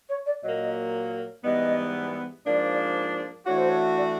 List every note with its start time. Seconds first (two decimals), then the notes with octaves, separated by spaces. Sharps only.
0.09 C#5
0.26 D5
0.42 A#2 F#3 A#3 D#5
1.43 G#2 E3 G3 B3 D#5
2.45 G#2 F3 A#3 D4 D5
3.46 E3 A3 D4 F#4 C#5
3.57 C5
3.68 C#5
3.97 D5